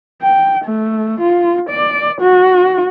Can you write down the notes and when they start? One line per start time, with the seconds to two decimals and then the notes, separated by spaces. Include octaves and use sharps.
0.22 G5
0.65 A3
1.20 F4
1.70 D5
2.21 F#4